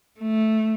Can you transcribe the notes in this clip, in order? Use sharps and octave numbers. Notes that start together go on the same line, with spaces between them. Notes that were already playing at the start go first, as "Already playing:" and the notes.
A3